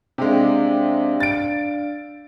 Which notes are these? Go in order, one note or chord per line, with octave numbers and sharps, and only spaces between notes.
C3 G#3 D4 D5 F5
A6 D7